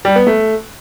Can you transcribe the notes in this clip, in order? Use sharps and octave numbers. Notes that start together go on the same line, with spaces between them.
G3
B3
A3